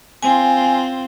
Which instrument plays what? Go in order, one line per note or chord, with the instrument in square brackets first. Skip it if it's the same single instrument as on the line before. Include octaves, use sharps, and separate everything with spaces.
[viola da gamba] C4 F4 [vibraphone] G#5